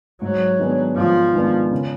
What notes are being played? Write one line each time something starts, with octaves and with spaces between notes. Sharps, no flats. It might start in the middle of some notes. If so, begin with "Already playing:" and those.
G#2 F#3
D#3 G#3 B3 D4
G#2 F3
D#3 G#3 B3 D4
C#3